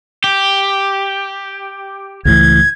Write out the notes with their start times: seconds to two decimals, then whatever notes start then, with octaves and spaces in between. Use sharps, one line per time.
0.24 G4
2.25 C#2 A2 E3 G#6